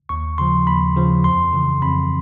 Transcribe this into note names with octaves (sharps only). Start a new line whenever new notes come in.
D#2 C#6
C#3 F3 C6
D#2 B5
C#3 F3
F2 C6
C#3 E3
F2 B5